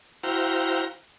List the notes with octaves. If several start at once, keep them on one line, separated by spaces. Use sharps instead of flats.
E4 F#4 C5 F5 G5 A#5